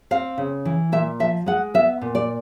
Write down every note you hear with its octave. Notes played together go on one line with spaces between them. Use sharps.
C4 F5
C#3
E3
A#2 E5
F3 E5
G#3 F#5
B3 E5
A#2
D5